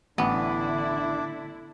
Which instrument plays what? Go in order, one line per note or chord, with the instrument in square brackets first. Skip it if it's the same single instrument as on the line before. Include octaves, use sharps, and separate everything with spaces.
[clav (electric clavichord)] A1 [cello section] D3 E4 [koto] B3 [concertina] D4